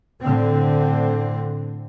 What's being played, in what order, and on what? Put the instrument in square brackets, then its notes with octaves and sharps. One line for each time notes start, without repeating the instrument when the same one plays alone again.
[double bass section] A2 D3 C4